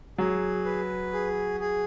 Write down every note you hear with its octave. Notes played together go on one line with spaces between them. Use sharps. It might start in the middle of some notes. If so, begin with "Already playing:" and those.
F#3 G#4
B4
G#4
G#4